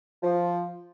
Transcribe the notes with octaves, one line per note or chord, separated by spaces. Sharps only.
F3